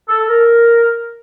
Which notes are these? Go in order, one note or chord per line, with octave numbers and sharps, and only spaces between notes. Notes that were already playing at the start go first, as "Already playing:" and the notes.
A4
A#4